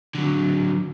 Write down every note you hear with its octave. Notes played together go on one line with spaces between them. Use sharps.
D3 F#3